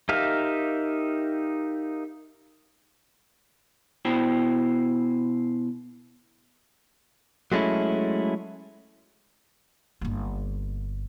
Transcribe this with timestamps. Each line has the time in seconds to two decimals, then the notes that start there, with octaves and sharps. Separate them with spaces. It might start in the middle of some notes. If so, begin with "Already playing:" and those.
0.09 D#4 G4 A#4 E5 F5
4.05 B2 E4 C5 G5
7.52 F#3 G#3 A3 C#4 E4
10.01 G1 A#3